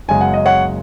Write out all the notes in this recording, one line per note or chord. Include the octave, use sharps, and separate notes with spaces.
F#1 F#2 C#3 G#3 G#5
F#5
D#5
C#5 F#5